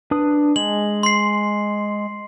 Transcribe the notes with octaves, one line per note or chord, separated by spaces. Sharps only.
D4 B4 D#6
G#3 F#7
C6 C7